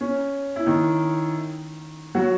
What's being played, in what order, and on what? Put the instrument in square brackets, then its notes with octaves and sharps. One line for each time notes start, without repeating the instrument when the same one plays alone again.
[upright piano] C#4
E4
D#3 D#4
F#3 F#4